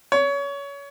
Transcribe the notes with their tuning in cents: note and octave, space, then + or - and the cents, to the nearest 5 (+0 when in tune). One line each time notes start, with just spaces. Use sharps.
C#5 +25